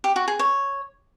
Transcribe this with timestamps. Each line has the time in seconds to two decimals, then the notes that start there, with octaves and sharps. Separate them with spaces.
0.04 G4
0.16 F#4
0.28 G#4
0.39 C#5